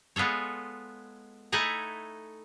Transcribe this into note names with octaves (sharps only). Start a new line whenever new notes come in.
G#3 B3 F4 A4 C#5
A3 D#4 E4 F#5 G#5 A#5